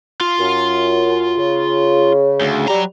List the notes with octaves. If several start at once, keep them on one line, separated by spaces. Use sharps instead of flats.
F4
F#2
C#3
D2
F#3 G3 A#5